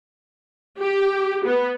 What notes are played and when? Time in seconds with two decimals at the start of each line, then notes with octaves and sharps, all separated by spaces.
0.79 G4
1.45 B3